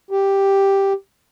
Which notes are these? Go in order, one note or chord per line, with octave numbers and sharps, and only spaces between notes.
G4